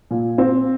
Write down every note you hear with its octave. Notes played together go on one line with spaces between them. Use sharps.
A#2
C4